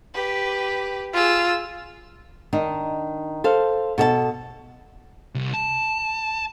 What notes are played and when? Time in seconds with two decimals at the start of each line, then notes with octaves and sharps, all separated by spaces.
0.14 G4 B4
1.14 F4 G#4 E6
2.53 D#3 D4 D#4
3.44 A4 C5 F5
3.98 B2 A4 D#5 A5
5.35 C2
5.54 A5